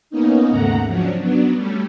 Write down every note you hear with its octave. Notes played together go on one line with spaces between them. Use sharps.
A#3 B3 C#4 D#4
D#2 G#2 C#3 A3 F#5 A#5
F3 F#3 C#4 D4
F#3 B3 D4
G3 A3 C#4